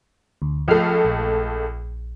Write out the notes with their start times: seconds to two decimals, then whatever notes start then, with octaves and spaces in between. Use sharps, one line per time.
0.42 D2
0.68 C#2 F3 A3 F6 C7
1.05 A#1